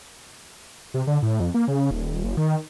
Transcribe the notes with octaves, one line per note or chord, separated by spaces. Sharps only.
C3
D3
A2
F2
A#3
C#3
D#1
F#1
D#3